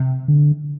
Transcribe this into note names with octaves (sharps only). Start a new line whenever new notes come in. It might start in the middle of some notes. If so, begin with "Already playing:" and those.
Already playing: C3
D3